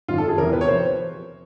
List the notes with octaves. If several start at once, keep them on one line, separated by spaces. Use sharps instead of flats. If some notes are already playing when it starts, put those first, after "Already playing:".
G#1 F#2 D#3 F4
A4
G#4
E1 E2 C3 E3 A#4
B4
C#5
C3 F3 C5